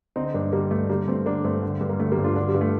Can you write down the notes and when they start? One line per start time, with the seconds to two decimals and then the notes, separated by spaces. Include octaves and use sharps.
0.16 D3 C4 D#4
0.34 G2 A#3 D4
0.52 D3 G3 A#3
0.71 G2 A3
0.89 D3 G3 A#3
1.08 G2 A3 C4
1.26 D3 A#3 D4
1.45 G2 A3 C4
1.63 D3
1.81 G2
1.89 A#3
2.00 D3 A3
2.12 G3 A#3
2.18 G2
2.24 D4 F4
2.36 D3 D4 F4
2.48 G3
2.55 G2
2.61 A3